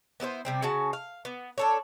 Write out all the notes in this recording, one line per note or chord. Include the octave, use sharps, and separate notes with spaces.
B3 E4 A4 C5
C3 G3 C4
C#3 C#4 F#4 A5
F5
B3
D4 A4 C#5